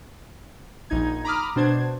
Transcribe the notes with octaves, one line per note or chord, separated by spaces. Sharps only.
A#1 D#4 G#6
A#5 B5 D6 D#6 F6
B2 D4 C5 G#6